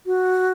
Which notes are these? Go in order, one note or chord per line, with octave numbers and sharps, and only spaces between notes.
F#4